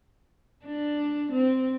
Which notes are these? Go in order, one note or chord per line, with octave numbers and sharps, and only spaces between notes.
D4
C4